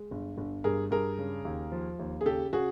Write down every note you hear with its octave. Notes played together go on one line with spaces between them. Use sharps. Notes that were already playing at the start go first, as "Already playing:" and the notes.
Already playing: G#3
G1
G1
G2 G#4 A#4
G2 G#4 A#4
C#3
D#2
F3
D#2
G#4
C#3 G4 A4
C#3 F#4 G#4